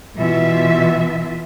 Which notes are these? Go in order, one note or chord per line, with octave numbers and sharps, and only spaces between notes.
B2 E3 F4 E5